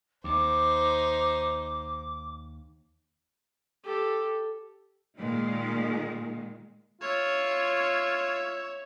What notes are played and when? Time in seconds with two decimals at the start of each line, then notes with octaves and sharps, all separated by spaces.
0.24 D#2 D#4 C5 D6
3.84 G4 A4
5.17 A#2 D#3 G#3
7.01 F4 C#5 E5